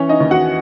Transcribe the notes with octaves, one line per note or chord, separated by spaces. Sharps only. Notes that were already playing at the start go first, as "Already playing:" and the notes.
Already playing: E3 C#4 C#5
D#4 D#5
D#2
F#4 F#5